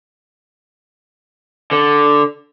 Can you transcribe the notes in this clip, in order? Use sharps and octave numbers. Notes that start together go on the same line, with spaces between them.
D3